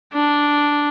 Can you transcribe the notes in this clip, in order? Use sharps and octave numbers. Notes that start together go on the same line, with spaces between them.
D4